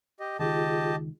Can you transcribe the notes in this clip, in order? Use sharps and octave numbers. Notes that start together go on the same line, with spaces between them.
G4 D#5
C#2 D#3 F4 G4 G#4 D#5 A5